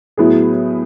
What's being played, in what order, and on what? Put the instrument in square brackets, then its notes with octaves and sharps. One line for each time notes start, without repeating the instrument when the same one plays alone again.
[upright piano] A2 F#3 B3 E4 G#4